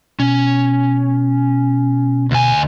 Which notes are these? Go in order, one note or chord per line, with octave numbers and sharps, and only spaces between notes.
B2 C#4
D2 G#5